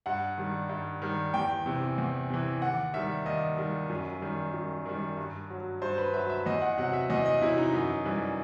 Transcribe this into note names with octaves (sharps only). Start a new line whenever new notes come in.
G2 F#5
D#3 G3
G2
D#3 G3
E2 G5
C3 E3
E2
C3 E3
D#2 F#5
D#3 G3 E5
D#2 D#5
D#3 G3
F#2
D#3 G3
F#2
D#3 G3
G2
F#3
G2 C5
B4
F#3 E5
E5
E2 D#5
F#5
C3 F#3 F#5
E5
E2 D#5
D#5
C3 F#3 E4
D#4
F#2
E3 G3